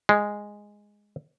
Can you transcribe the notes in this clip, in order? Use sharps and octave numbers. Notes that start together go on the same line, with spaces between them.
G#3